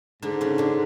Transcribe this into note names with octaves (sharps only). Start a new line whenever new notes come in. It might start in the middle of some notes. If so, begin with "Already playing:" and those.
G#2 D3 D4
C#3 C#4
D3 D4